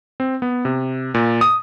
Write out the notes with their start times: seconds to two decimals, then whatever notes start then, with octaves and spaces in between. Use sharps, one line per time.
0.20 C4
0.42 B3
0.65 C3
1.14 A#2
1.41 D#6